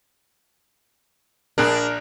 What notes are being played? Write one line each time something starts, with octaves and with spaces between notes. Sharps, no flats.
A#1 D4 G#4 A#4 F#6